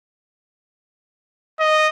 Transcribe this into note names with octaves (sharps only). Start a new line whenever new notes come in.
D#5